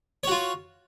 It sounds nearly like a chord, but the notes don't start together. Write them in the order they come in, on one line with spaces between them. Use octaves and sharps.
C#5 F#4 F4